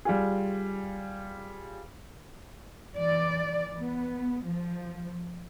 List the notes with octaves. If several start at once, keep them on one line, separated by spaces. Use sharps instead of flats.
G3 F4 G#4
E3 D5
B3
F3